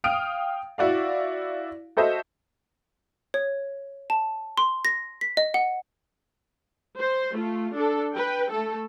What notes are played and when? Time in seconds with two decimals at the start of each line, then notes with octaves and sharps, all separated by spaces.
0.04 F5 G5 D#6 F6 D7
0.78 E4 F#4 D5 F5
1.97 F#4 A4 C5 D#5 E5
3.34 C#5
4.10 A5
4.57 C6
4.85 A#6
5.21 B6
5.37 D#5
5.54 F#5
6.98 C5
7.32 A3 F4
7.73 D4 A4
8.14 B4 G5
8.50 A3 A4